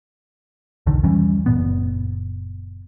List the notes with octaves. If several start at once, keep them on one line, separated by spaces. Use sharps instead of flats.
B1 E2 D3 D#3
E2 E3 G3 C#4
F#1 A#2 B3